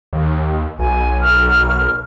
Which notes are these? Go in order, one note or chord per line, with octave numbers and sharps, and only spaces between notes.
D#2
B1 G#5
A#4 C#6 F6